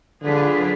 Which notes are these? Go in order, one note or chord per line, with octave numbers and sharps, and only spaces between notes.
D3 F#3 D4 F4 G#4 B4